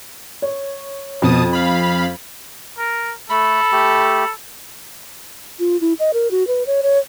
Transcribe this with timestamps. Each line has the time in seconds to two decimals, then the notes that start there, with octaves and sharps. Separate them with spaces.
0.42 C#5
1.22 F2 B2 A5 D#6
1.53 F5 B5
2.78 A#4
3.30 A3 A4 B5
3.72 A3 G4
5.60 F4
5.81 E4
5.99 D#5
6.14 A#4
6.31 F#4
6.47 B4
6.67 C#5
6.83 C#5